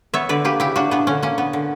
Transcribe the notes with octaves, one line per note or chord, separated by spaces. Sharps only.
B3 C#5 E5
D3 B4 D5
A#3 G4 B4
C#3 E4 G4
A#3 D4 F#4
A#2 B3 D4
D3 C#4
A#3 C#4
B3
D3